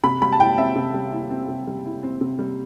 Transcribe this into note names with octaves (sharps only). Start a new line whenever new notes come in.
C3 B5
G3 B5
A5
E4 G5
C4 E5
C3
G3
E4
C4
C3
G3
E4
C4
C3
G3